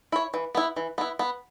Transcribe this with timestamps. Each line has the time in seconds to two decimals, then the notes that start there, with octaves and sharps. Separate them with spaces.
0.12 E4 C#5
0.34 E3
0.55 B3 E4
0.76 E3
0.98 B3 E4
1.19 B3